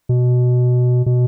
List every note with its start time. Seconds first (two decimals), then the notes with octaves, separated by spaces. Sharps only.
0.09 B2
1.06 B2